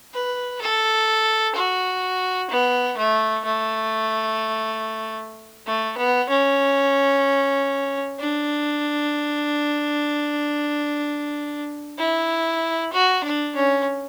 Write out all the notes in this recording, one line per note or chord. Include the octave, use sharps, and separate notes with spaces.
B4
A4
F#4
B3
A3
A3
A3
B3
C#4
D4
E4
F#4
D4
C#4